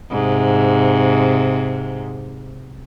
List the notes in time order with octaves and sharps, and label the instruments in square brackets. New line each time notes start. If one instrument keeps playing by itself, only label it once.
[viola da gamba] G#2 C3